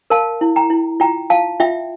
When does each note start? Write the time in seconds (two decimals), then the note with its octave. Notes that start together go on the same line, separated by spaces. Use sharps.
0.10 A#4 F5 A5
0.41 E4
0.56 G5 A#5
0.70 E4
1.00 F4 G5 A#5
1.30 F4 F5 A5
1.60 F4 E5 G5